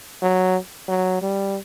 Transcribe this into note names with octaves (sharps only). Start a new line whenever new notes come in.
F#3
F#3
G3